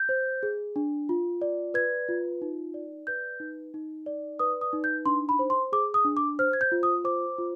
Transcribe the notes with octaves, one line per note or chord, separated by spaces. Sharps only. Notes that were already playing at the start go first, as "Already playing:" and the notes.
Already playing: G6
C5
G#4
D4
F4
D5
B4 G#6
F4
D#4
D5
B4 G6
D#4
D#4
D5
B4 D#6
D#6
D#4
G6
D4 C6
B5
C5
C6
G#4 D6
D#6
D4
D6
C5 F6
G#6
G6
F4
D#6
C5 D6
F4